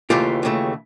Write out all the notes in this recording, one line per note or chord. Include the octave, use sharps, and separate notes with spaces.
D#2 C#3 E3 A3 F4 G4
D#2 C#3 E3 A3